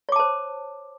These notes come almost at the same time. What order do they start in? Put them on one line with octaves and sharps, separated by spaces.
C#5 D6 A5 C5